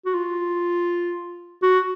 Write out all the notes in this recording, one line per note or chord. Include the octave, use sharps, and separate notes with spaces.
F#4
F4
F#4